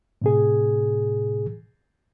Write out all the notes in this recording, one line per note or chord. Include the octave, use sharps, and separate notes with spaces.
A2 C3 G#4